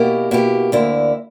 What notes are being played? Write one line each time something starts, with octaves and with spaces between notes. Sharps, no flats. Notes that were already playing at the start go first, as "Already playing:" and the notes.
Already playing: B2 A#3 E4 G4
B2 A#3 E4 G4
D2 D3 A#3 E4